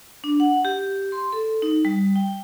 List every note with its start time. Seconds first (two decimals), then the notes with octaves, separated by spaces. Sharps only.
0.24 D4
0.40 F#5
0.65 G4
1.12 C6
1.33 A4
1.62 D#4
1.85 G3
2.16 G5